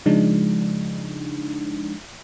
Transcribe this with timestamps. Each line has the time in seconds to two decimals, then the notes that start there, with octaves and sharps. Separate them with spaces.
0.06 C#3 F3 G#3 D4 D#4